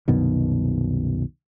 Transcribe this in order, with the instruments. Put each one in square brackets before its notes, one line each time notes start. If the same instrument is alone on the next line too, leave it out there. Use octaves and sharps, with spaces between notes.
[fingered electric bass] C2 F#2 B2 D#3